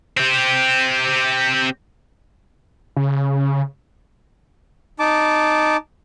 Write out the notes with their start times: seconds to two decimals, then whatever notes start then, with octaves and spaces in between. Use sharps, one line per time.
0.17 C4 G4
2.96 C#3
4.99 D#4 A5 D6